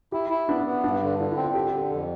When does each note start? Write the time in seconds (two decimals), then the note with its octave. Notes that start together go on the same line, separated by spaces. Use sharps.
0.12 E4 G4
0.30 E4
0.48 B3 D4
0.66 B3
0.84 G2 D4
1.02 D3
1.19 D3 E4
1.32 E4
1.37 C4
1.43 F4
1.55 D3 G4
1.67 G4
1.73 D3
1.79 G4
1.90 F2 A4